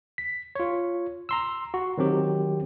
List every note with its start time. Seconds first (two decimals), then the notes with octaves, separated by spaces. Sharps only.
0.18 B6
0.55 F4 C#5
1.29 A#5 C6 E6
1.74 F#4
1.98 D#3 F#3 C4 G4